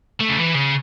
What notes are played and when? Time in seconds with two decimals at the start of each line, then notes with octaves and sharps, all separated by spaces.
0.20 A3
0.29 C#3
0.38 E3
0.55 C#3